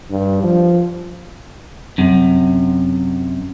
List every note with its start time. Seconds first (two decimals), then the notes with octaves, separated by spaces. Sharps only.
0.10 G2
0.43 F3
1.98 F#2 C3